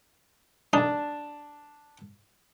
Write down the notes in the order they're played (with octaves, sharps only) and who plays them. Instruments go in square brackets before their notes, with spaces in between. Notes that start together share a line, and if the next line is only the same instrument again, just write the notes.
[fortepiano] D4 A5 [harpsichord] D#4